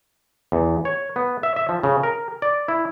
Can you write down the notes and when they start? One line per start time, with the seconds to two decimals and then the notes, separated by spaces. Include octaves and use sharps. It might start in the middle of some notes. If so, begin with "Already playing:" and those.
0.52 E2
0.85 C#5
1.16 B3
1.43 E5
1.56 E5
1.69 F3
1.83 C#3
2.03 A#4
2.42 D5
2.68 E4